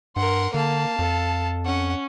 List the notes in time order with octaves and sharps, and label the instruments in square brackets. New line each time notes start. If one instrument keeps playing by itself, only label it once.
[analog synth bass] G2 [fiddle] A#4 F#5 [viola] C6
[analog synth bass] D3 [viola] A#3 [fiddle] F5 A5
[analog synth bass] F2 [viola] A4
[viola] C#4 [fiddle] F#5